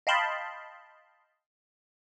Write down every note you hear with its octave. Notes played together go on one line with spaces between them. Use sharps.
D#5 F5 G5 A5 B5 C6